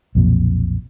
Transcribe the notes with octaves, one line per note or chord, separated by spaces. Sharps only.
B1 F2 A#2